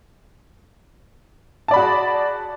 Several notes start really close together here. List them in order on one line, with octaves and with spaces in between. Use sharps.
A5 D5 B5 F#4 G#4